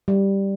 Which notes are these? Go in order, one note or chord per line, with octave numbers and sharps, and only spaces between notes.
G3